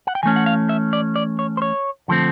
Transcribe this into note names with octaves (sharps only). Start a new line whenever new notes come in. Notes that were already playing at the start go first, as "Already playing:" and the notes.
F#5
G5
E3 A3 C#4 G#5
F#5
F5
E5
D5
D5
C#5
C5
C#5
D3 F3 A3 C4